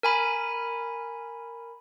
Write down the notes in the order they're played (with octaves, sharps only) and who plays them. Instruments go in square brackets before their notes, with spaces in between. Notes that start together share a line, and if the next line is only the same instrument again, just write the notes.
[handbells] A#4 G#5 B5